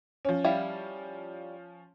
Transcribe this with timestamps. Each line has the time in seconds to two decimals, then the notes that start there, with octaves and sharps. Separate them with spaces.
0.25 F3 C#4
0.44 G3 E4 F5